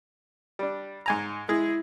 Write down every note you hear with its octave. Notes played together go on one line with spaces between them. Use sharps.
G3 D4
G#2 G#5 A#5
G#3 E4 G#4